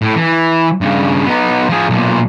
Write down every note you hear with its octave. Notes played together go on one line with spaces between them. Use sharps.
A2
E3
G2 C#3
B3 D#4
F3 G#4
B1 A#2